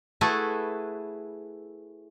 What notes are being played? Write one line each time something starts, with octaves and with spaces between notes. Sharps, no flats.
A3 E4 F#4 G#4 A4 B4